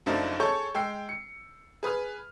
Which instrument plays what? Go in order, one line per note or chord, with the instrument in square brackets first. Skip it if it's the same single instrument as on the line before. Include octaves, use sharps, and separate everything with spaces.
[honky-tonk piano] F#1 F#2 F3 A3 D4 D#4
G#4 A4 C#5 C#6 G6
G#3 G5 E6 C7
C#7
G#4 B4 D#6 F6